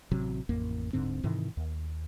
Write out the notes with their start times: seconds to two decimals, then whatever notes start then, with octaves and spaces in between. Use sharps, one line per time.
0.11 A1 C3 F#3
0.49 A1 F2 A#3
0.93 D1 G#2 D3 C4
1.23 G#2 C3 D#3 E3
1.57 D#2